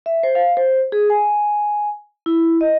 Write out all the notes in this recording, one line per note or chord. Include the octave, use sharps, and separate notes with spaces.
E5
C5
F5
C5
G#4
G#5
E4
D#5